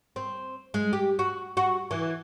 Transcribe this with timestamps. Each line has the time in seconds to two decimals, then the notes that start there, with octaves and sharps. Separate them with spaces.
0.16 C4
0.74 G#3
0.93 G4
1.19 F#4
1.57 F#4
1.91 E3